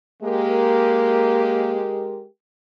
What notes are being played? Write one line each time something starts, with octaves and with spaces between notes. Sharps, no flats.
G#3 A#3 G4 A#4